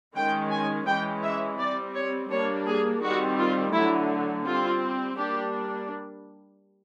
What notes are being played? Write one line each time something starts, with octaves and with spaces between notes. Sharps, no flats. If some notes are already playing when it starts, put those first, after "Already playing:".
D#3 G#3 C#4 G5
G#5
E3 G#3 C#4 G5
E5
G3 C4 D5
C#5
G3 A#3 D4 C#5
G#4
D#3 G3 C4 F#4
F4
D3 F#3 A3 E4
G3 C4 F4
G3 A#3 D4 G4